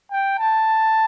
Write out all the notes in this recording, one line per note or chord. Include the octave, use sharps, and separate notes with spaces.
G5
A5